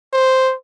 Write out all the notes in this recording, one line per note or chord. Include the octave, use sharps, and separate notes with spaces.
C5